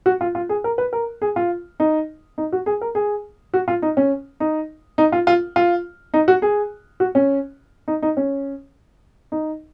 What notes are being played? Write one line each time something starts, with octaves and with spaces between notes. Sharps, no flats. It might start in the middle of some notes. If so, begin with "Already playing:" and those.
F#4
F4
F4
G#4
A#4
B4
A#4
G#4
F4
D#4
D#4
F#4
G#4
A#4
G#4
F#4
F4
D#4
C#4
D#4
D#4
F4
F4
F4
D#4
F#4
G#4
F#4
C#4
D#4
D#4
C#4
D#4